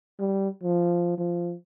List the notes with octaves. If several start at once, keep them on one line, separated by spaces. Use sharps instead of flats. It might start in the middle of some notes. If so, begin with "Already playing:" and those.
G3
F3
F3